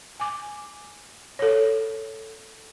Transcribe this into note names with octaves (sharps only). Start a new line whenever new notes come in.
G#5 D6
A4 C#5